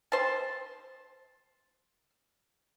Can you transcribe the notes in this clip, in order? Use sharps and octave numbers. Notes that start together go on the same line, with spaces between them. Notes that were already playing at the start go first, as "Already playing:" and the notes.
C5 A5